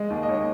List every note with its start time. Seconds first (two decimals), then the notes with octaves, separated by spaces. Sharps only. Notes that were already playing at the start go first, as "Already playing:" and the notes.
Already playing: G#3 D#5
0.10 D#2
0.23 D#5
0.29 D#2 C#5